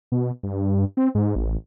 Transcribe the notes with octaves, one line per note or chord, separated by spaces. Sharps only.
B2
G2
C4
G#2
A1